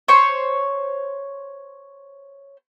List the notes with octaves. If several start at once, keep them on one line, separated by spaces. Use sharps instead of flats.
C5 C#5 C#6